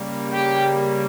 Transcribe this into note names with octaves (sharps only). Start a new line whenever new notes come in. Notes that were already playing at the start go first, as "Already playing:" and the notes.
Already playing: C#3 G3 A#3
G4